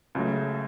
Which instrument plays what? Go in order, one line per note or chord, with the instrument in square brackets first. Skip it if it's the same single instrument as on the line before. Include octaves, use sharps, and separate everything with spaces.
[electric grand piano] C#2 C#3 F#3 A3